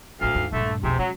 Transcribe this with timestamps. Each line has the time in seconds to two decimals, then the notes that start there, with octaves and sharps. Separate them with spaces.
0.21 A1 D2 A2 F5
0.35 D#2 G#2
0.53 A#1 G2 D3 A3
0.83 B1 F2 G#2 C3
0.99 C#3 F#3 G#3